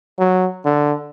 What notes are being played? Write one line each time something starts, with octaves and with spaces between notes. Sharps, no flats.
F#3
D3